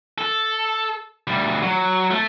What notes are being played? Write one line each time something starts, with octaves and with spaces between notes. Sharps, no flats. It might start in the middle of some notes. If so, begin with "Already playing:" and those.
A4
D2 G3
F#3
A3 A5